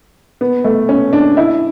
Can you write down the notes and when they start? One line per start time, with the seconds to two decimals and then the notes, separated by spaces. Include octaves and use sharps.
0.41 B3
0.64 A3
0.89 C#4
1.13 D4
1.37 E4